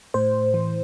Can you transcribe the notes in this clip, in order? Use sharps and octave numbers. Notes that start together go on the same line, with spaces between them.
A2 C5
E3